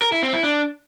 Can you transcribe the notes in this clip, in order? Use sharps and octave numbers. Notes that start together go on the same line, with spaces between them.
A#4
E4
C4
E4
D4